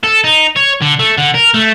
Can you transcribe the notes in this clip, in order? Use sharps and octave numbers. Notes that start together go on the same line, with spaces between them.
A4
D#4
C#5
D3
A3
D3
A#4
A3